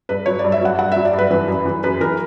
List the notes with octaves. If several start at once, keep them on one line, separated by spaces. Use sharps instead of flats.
G2 B4
F#3 C#5
D5
G2
E5
F#3 F#5
G2 F#5
F#3 E5
D5
G2
B4
E3 B4
F#2
E3
F#2 B4
E3 A#4